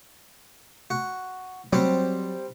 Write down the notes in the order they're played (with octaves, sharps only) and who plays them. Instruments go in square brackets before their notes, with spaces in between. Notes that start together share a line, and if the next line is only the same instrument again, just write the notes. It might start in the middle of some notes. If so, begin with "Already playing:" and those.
[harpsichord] F#4
[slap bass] F#3 [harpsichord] G3 C4